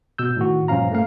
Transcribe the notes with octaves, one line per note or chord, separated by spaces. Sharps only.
B2 E6 G6
A2 D#3 F#4
G2 A#2 F3 C#4 F5 A#5
A3 A#3 F5